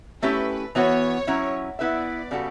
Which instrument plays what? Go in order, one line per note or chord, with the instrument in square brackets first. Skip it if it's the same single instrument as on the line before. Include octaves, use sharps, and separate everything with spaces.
[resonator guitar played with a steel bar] A3 C#4 E4 G4 [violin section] B4
[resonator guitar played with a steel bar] E3 B3 F#4 [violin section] C#5
[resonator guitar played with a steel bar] F#3 C#4 E4
[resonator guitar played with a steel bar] B3 E4 B4 E5 [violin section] D5
[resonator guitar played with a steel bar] C#3 G3 B3 F#4 A4